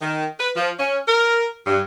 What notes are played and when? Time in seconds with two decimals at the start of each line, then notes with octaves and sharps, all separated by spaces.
0.02 D#3
0.39 B4
0.56 F3
0.79 C#4
1.08 A#4
1.67 G2